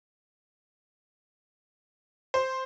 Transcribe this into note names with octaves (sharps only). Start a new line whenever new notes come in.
C5